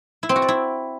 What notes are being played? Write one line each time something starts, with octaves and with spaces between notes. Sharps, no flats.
E4
C4
F#4
D5
E4